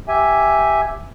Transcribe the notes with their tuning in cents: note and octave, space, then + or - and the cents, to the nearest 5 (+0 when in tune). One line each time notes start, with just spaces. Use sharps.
G4 +0 E5 +0 G#5 +0